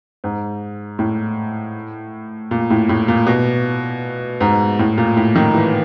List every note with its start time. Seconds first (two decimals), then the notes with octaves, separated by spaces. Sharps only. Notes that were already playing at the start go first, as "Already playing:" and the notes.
0.24 G#2
0.99 A2
2.51 A#2
2.70 A2
2.89 A2
3.08 A#2
3.27 B2
4.41 G#2
4.79 A2
4.98 A#2
5.17 A2
5.35 D#3
5.54 E3